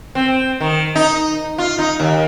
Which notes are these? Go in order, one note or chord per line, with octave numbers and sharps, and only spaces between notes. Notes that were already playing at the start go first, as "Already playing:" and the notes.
C4
D#3
D#4
F4
D#4
D#2